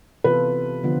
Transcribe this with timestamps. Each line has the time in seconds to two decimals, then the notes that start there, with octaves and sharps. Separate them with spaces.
0.24 C3 E3 B3 F4 A4 B4
0.84 D3 F3 B3 F4